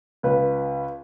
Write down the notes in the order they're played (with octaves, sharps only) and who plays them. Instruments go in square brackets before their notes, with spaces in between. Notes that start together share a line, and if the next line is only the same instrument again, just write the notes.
[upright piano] C#2 B4